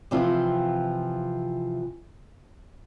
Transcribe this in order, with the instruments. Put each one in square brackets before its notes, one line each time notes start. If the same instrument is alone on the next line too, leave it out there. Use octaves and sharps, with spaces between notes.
[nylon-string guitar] C3 E3 F3 C4 F4